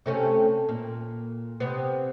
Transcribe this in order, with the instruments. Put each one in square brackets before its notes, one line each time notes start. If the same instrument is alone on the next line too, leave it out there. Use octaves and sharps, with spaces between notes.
[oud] C3 A3 C#4
A#2
C3 B3